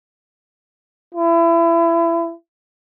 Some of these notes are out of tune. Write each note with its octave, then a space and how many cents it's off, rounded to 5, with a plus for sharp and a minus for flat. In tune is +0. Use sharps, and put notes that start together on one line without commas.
E4 +30